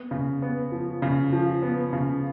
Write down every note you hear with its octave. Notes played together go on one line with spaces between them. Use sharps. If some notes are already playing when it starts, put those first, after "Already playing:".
Already playing: B3
C#3
B3
F3
C#3
F3
B3
C#3